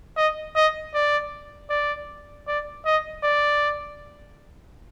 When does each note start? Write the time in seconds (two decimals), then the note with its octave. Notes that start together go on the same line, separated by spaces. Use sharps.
0.17 D#5
0.56 D#5
0.94 D5
1.70 D5
2.48 D5
2.85 D#5
3.24 D5